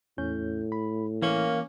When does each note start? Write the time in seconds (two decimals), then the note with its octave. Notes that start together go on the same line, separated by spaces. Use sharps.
0.18 E2 A2 C#4 G6
0.72 B5
1.22 E3 A#3 C#4